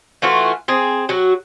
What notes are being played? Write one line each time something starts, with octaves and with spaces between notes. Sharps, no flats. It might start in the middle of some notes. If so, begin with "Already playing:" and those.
E3 A3 F4 F#4
C4 G#4
F#3 F#4